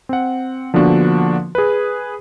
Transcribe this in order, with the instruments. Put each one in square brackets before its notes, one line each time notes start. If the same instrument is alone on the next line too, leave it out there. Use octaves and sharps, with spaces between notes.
[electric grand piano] C4 F#5
D3 F3 A#3 B3 D4 F#4
G#4 B4